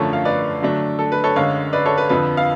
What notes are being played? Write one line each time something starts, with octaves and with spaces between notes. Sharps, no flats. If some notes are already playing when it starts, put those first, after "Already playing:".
Already playing: F#2 D3 F3 A3 A4 C#5
F5
B4 D5
D3 F#3 A3 D4
A4
B4
A4 C#5
F#2 D3 G#3 C#5 F5
B4 D5
A4 C#5
B4
F2 D3 F3 B4
F5